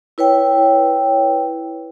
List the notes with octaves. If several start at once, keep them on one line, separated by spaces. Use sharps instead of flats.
E4 B4 C#5 G5